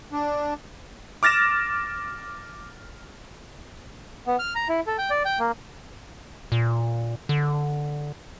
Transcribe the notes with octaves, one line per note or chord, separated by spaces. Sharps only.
D4
D6 F6 A6 A#6 E7
B3
F6
A#5
E4
A4
G5
D5
G5
A#3
A#2
D3